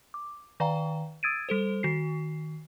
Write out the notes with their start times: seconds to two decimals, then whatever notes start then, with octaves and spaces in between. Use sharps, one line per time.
0.14 D6
0.60 D#3 B4 D5 F5 G5 A#5
1.23 D#6 E6 G#6 A6 D7 D#7
1.49 G3 A4 C5
1.83 D#3 F#4 C7